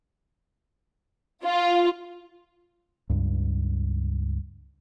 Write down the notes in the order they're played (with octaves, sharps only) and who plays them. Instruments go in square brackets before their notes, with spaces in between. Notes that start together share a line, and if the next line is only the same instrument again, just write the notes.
[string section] F4
[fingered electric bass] C#2 G2